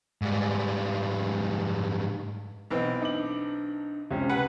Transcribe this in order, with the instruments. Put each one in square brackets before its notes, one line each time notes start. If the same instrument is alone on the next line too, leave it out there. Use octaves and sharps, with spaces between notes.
[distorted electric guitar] G#2 G3
[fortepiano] B1 E3 C4 [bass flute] D#5
[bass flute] D4 [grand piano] D#4 D6 F#7
[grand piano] C#2 C#4 G4 [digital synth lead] C3
[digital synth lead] B4 [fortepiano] F#5